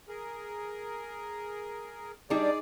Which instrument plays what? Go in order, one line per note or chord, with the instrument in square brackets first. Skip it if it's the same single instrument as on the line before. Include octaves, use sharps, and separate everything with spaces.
[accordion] G#4 A#4
[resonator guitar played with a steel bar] G3 D4 [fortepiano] D#4 [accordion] G#4 D5